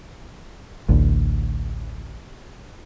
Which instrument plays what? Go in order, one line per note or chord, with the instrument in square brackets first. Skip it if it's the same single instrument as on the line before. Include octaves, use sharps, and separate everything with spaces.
[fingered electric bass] A1 D2